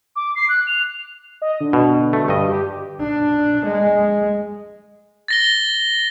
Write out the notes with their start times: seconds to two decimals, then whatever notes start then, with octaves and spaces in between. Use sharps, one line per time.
0.16 D6
0.35 C7
0.49 F#6
0.67 F7
1.42 D#5
1.61 D3
1.73 B2
2.13 A3
2.28 G2 D#5
2.49 G4
3.01 D4
3.65 G#3
5.28 A6 A#6 G7